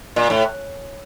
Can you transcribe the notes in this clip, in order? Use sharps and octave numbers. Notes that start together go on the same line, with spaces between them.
A#2
A2